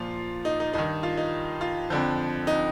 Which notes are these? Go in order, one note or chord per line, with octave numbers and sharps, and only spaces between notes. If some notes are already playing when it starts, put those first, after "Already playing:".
Already playing: A#2 F3 F4
D#4
D#4
G2 D#3 D#4
F4
D#4
F4
F2 D3 F3
D#4